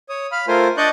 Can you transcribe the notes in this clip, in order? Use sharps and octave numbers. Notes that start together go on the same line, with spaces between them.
C#5 D#6
F5 B5 F6
A3 F4 A#4 C5 G#5
D4 D5 D#5 C#6 F#6 G6